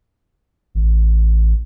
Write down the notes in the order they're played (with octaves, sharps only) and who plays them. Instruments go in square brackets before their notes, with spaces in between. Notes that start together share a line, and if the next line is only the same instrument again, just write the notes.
[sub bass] A1